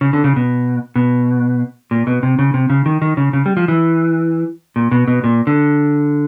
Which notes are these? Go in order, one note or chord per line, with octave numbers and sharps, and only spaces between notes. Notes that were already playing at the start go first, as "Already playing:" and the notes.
C#3
D3
C#3
B2
B2
A#2
B2
C3
C#3
C3
C#3
D#3
D#3
C#3
C#3
G3
F3
E3
A#2
B2
B2
A#2
D3